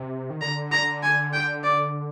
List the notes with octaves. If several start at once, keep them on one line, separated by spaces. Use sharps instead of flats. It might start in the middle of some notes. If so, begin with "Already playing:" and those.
Already playing: C3
D#3
D3 A#5
A#5
G#5
G5
D5